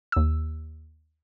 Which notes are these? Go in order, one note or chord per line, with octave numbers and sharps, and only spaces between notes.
D#2 E6